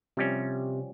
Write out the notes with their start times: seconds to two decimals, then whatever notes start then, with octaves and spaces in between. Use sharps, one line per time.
0.17 C3 F3 G3 C#4